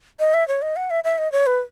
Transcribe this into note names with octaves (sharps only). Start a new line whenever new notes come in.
D#5
E5
C#5
D#5
F#5
E5
E5
D#5
C#5
B4